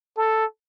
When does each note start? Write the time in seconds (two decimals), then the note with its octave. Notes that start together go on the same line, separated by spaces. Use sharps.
0.17 A4